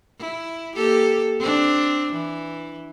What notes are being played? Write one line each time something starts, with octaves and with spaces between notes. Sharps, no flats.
E4
A#3 G4 A4
C4 D4
E3